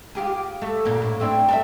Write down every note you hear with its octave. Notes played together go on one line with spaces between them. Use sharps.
F4 G4 G#4
A3
D2 A#2 A#3
A2
A3 C4 D4
A4 B4 E5